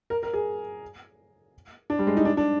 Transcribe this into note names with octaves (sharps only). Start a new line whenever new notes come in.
A#4
A#4
G#4
D4
G3
G#3
D#4
D4
D4